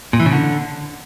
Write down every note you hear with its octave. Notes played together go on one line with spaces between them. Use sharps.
A#2
E3
C#3
D3